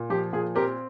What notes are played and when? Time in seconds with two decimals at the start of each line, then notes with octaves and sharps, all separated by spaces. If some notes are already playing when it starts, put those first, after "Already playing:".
Already playing: A#2
0.10 F3 G4
0.33 A#2 G#4
0.55 C4 G4 A#4